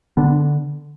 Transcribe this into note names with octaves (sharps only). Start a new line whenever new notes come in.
D3 B3 D4